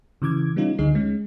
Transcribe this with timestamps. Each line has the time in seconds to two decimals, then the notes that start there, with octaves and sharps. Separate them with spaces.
0.22 C#3 E3 D6 G#6
0.56 G3 B3 C#4 D#4 F4
0.78 D2 D3 D#4 G#4 C7
0.95 G#3 C#4